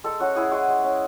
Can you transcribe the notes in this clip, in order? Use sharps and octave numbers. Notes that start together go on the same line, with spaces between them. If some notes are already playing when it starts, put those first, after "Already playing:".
G#3 A4
C#4 F#4
E4 G#4
G#3 F#4
G#3
C#4